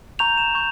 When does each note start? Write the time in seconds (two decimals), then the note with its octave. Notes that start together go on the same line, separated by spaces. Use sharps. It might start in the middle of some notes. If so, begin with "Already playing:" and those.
0.19 A#5 C#6 G6 F7
0.37 E7
0.55 A#5 C#6 G6